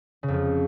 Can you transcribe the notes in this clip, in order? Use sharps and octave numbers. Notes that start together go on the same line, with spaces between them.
C#3
F2
F3